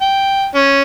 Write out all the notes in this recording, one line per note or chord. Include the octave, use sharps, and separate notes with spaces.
G5
C#4